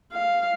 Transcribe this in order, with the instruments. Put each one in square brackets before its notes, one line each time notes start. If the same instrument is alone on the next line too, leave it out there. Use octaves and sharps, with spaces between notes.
[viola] F5